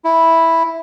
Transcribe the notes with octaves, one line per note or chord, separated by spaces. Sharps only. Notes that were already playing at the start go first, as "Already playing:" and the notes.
E4